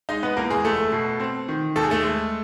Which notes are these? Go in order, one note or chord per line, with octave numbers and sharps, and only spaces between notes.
G#3 D#4 D#5
B3 B4
E2 A#3 A#4
G#3 G#4
F#1 A3 A4
B2
C4
D#3
D#2 A4
G#4
A3 A4
G#3